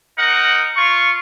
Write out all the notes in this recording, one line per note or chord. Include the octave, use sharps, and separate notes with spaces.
D#4 A#4 F#5
F4 C#6